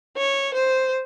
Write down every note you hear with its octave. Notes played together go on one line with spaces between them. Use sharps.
C#5
C5